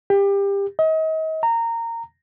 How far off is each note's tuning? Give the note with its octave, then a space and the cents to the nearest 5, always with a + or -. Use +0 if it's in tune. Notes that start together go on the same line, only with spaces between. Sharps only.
G4 +25
D#5 +35
A#5 -20